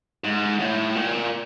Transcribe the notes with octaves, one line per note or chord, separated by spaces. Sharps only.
G#2
A2
A#2